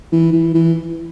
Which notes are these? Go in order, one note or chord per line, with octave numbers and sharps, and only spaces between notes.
E3
E3
E3